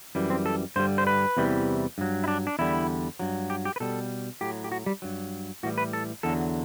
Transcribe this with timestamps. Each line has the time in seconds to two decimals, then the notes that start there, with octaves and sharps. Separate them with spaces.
0.15 F#2 E3 G3
0.30 C4
0.46 A4
0.76 G2 D3 G3 C5
0.98 C5
1.07 B4
1.37 E2 C3 E3 G3
1.98 G2 F#3
2.24 E4
2.28 D4
2.47 D4
2.59 E2 D3 G3 E4
3.20 G2 F#3
3.50 G4
3.65 G4
3.76 B4
3.80 B2 G3 A4
4.41 A2 F#3 G4
4.64 G4
4.72 F#4
4.86 G3
5.02 G2 F#3
5.63 A2 E3 G3 F#4
5.78 B4
5.93 A4
6.23 E2 D3 F#3 A4